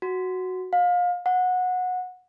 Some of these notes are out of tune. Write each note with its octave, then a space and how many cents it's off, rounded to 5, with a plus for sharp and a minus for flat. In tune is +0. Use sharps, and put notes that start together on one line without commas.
F#4 +0
F5 +30
F#5 -20